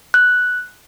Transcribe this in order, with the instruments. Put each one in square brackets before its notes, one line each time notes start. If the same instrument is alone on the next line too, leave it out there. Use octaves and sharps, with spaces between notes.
[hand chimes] F#6